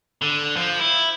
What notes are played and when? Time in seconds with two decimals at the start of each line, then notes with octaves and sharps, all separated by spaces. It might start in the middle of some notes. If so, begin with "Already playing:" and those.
0.22 D3
0.56 F3
0.79 E4